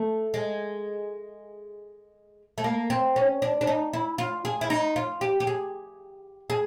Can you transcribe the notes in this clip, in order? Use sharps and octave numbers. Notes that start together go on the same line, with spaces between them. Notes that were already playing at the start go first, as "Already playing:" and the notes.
Already playing: A3
G#3
A3
A#3
C4
C#4
D4
D4
D#4
E4
F4
G#4
E4
D#4
F4
G4
G4
G#4
G#4